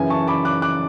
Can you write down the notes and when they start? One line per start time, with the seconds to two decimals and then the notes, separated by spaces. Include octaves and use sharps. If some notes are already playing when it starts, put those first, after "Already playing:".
Already playing: F#2 C#3 E3 G#5
0.10 A5 C#6
0.28 B5 D6
0.45 D6 F#6
0.62 D6 F#6